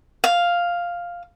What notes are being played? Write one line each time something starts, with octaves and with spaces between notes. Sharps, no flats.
F5